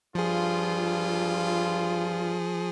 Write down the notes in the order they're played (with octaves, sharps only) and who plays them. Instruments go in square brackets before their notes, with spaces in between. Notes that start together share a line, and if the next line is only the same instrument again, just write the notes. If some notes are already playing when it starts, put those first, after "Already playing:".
[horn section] G2 F4 [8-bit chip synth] F3 G#4